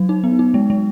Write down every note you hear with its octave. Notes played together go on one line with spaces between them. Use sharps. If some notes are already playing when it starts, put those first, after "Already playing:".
Already playing: F#3
D#4
B3
D#4
G#3
G#3